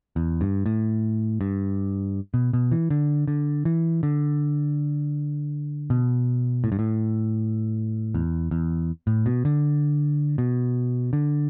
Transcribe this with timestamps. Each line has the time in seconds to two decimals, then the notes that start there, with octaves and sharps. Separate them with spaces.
0.16 E2
0.41 G2
0.66 A2
1.41 G2
2.34 B2
2.53 B2
2.72 E3
2.90 D3
3.28 D3
3.65 E3
4.03 D3
5.90 B2
6.64 A2
6.72 G2
6.79 A2
8.15 E2
8.51 E2
9.07 A2
9.26 B2
9.45 D3
10.38 B2
11.13 D3